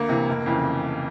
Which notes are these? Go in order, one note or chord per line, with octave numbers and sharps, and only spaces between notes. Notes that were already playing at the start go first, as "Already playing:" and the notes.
Already playing: D2 A#3
C3 E3
F1
F2 C#3 E3